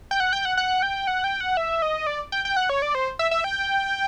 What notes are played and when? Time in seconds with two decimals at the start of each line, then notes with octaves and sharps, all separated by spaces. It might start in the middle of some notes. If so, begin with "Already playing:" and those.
0.11 G5
0.20 F#5
0.33 G5
0.45 F#5
0.57 F#5
0.82 G5
1.07 F#5
1.24 G5
1.41 F#5
1.57 E5
1.82 D#5
2.07 D5
2.32 G5
2.45 G5
2.57 F#5
2.69 C#5
2.82 D5
2.95 C5
3.19 E5
3.31 E5
3.44 G5